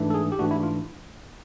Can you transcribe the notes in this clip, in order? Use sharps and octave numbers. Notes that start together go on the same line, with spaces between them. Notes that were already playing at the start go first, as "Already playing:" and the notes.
Already playing: G#2 E3 A3 D4
A4
G#4
G4
G#2 E3 A3 D4 F#4
E4
F4